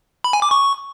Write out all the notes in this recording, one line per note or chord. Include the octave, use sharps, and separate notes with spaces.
B5
G#5
D6
C#6